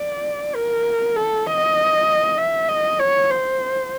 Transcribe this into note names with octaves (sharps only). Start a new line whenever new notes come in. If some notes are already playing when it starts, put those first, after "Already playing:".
Already playing: D5
A#4
A4
D#5
E5
D#5
C#5
C5